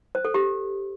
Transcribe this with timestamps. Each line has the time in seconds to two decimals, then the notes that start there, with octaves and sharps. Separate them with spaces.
0.15 C5
0.25 A4
0.34 G4